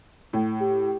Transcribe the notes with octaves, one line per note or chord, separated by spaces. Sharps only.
A2
G4